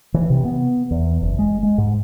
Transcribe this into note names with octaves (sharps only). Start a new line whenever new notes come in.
E3
C3
B3
E2
F#1
G#3
G#3
G#2